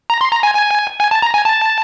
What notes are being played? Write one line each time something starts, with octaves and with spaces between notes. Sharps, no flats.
A#5
C6
A#5
G#5
G#5
G#5
A5
A#5
G#5
A5